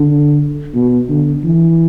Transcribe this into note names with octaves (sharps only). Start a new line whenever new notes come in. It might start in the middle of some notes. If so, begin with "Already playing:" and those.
Already playing: D3
B2
D3
E3